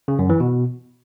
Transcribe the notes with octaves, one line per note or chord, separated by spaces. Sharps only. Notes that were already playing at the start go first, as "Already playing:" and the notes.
C#3
F#2
E3
B2